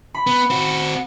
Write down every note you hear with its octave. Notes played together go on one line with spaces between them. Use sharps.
B5
B3
C4 F#4